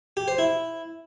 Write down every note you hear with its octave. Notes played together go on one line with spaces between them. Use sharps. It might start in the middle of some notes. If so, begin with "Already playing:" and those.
G4
C5
E4